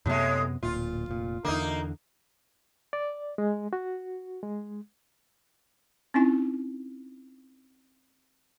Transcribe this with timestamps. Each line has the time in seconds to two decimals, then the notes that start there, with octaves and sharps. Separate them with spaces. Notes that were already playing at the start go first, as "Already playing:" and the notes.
0.06 F#2 A2 C3 G#3 B3
0.63 D1 A#2 F4
1.08 F1 A#2
1.45 E2 D3 A#3 D#4
2.93 D5
3.38 G#3
3.73 F#4
4.43 G#3
6.14 C4 C#4 D#4 E4 G#5